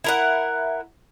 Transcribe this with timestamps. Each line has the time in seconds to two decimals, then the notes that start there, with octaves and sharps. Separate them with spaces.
0.04 E4 A#4 F#5